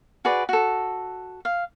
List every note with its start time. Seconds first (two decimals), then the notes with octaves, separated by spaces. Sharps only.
0.25 F#4 G#4 B4 D5
0.49 F#4 A4
1.45 F5